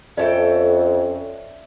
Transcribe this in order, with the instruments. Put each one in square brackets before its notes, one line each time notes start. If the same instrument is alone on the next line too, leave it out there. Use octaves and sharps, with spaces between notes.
[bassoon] F2 [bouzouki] C#4 A4 G5 [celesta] D5 E5